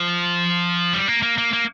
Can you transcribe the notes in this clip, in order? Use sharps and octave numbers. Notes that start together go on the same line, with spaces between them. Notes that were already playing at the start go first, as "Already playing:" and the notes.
Already playing: F3
G3
A#3
A#3
A#3
A#3